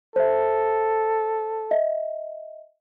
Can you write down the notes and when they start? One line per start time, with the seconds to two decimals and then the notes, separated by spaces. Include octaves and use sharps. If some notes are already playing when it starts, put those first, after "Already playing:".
0.16 A4 C5 E5
1.71 D#5 E5